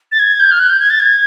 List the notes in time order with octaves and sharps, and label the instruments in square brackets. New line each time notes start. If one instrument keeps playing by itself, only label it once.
[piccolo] A6
G#6
G6
F6
F#6
G6
G#6
A6
G#6